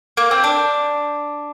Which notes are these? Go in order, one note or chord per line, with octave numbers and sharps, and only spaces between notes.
A#3
C4
D4